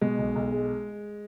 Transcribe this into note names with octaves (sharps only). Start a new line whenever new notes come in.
B2 G#3
B1
B1
G#3